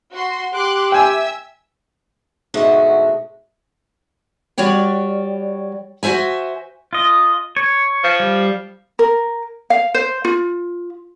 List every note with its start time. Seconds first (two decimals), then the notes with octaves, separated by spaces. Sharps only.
0.12 F#4 C6
0.54 G4 C6 D6 F#6
0.92 E5 G5 G#5 E6
2.54 G#2 B2 D3 A3 F#4
4.58 G3 F#4 C#5 D5 G5
6.03 F#4 A#4 C5 E5 G#5
6.93 F4 D#5
7.57 C#5
8.04 F3
8.20 G3
8.99 A#4
9.70 F5
9.94 C5
10.25 F4